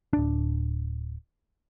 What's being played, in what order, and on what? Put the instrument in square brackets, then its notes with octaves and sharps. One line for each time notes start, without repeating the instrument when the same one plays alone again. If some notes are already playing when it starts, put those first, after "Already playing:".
[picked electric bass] D1 D4